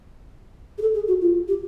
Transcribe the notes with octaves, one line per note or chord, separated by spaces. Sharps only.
G#4
A4
G#4
F#4
F4
G4